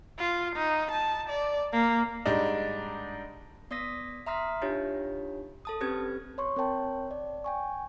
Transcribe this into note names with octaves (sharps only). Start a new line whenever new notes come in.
F4
D#4
A5
D5
A#3
G#2 G3 D4 D#4
B3 D5 D#6 A#6 B6
E5 A#5 C6 D#6 F6 B6
D4 D#4 F4 G4 C#5
A4 A5 D#6
C4 C#4 G4 B4 G#6
C#5 C6 C#6
C4 A#4 C#5 G5 A5
D5
G5 G#5 C#6